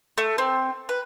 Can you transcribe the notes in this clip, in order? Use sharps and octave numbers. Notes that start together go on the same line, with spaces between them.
A3
C4
B4